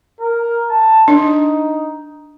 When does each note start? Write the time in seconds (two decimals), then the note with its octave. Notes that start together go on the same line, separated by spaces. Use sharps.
0.20 A#4
0.70 A5
1.08 D4 D#4